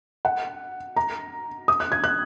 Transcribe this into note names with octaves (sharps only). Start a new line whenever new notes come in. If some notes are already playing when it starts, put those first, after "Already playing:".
F#5
A#5
D#6
F#6
G#6
F#6